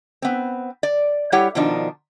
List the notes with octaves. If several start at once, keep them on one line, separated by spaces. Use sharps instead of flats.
B3 C4
D5
G3 E4 G4 C#5 F#5
B2 D#3 F3 D4 D#4